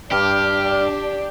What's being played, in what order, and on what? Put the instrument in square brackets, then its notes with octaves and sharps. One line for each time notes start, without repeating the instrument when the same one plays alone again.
[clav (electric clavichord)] G2 [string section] D4 [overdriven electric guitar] G4 [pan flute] F6